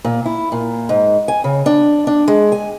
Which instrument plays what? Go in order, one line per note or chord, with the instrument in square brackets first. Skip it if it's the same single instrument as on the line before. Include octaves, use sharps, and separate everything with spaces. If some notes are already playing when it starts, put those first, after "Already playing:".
[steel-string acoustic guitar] A#2
E4
A#2
G#2
G#5
C#3
D4
D4
G#3
G#5